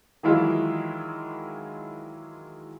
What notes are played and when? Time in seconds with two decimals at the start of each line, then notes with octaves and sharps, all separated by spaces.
0.23 D#3 E3 F#3 G#3 E4 F4